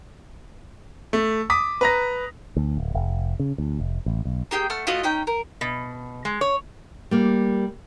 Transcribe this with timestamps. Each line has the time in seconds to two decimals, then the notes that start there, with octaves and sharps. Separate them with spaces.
1.13 A3
1.50 D6 D#6 B6
1.81 B4 A#5 A#6
2.57 D2
2.77 D1
2.94 F1
3.40 C#3
3.58 D2
3.79 F1
4.06 A1
4.25 B1
4.51 A#3 G4 G#4 G5
4.70 A3 F#5 A5 F6
4.87 A3 F4 F#4 D#5
5.03 C#4 D#4 G5
5.27 A#4
5.61 B2
6.25 G#3
6.41 C#5
7.11 G3 A#3